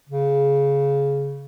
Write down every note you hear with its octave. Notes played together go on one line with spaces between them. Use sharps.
C#3